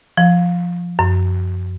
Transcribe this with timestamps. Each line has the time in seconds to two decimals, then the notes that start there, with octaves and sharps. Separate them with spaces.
0.17 F3
0.99 F#2